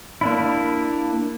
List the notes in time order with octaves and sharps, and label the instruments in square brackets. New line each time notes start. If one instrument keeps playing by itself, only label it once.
[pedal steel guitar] A#3 D4 E4